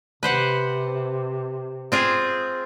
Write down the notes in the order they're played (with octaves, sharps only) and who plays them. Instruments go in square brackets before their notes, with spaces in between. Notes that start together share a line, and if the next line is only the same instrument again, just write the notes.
[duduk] C3 [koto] B4 C5 F#5
[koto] C4 F4 G#4